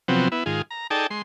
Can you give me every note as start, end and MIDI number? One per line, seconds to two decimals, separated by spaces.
0.08 0.28 48
0.08 0.28 53
0.08 0.28 54
0.08 0.28 59
0.08 0.28 60
0.32 0.44 59
0.32 0.44 64
0.46 0.62 44
0.46 0.62 51
0.46 0.62 65
0.46 0.62 68
0.71 0.87 82
0.90 1.07 63
0.90 1.07 68
0.90 1.07 69
0.90 1.07 74
0.90 1.07 79
0.90 1.07 81
1.10 1.22 56
1.10 1.22 84